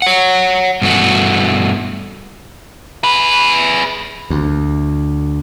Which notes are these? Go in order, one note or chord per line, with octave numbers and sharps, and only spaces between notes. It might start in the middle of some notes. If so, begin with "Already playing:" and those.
C#5 F#5
G2 B2 E3 A3 F#4
G#4 B4
D2